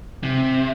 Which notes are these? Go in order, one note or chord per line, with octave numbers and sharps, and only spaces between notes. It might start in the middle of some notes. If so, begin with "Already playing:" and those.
C3